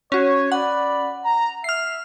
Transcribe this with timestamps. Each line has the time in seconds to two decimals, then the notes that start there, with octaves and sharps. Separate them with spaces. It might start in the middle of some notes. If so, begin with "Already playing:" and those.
0.12 C#4 F#4 C#5
0.52 D5 F#5 B5
1.25 A#5
1.64 E5 F6 C7